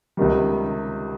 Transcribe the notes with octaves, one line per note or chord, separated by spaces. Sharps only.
C#2 C3 D#3 G3